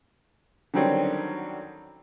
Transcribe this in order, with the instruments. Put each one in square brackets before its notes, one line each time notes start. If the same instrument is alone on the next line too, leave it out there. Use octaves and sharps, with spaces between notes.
[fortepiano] D3 D#3 F#3 G3 C4 C#4